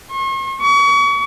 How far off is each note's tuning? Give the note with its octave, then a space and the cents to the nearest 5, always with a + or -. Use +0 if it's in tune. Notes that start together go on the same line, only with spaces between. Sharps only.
C#6 -45
C#6 +35